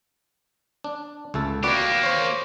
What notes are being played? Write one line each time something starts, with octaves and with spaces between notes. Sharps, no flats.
D4
C#2 A3 A4
A#3 F#4 G4 B4 D5
C5 C#5